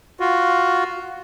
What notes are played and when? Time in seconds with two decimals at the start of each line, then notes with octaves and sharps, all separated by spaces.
0.20 F4 F#4